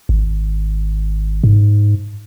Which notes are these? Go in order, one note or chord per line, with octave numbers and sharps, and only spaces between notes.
G#1
G#2